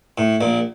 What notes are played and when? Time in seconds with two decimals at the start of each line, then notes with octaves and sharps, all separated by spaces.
0.18 A2
0.41 A#1 A#2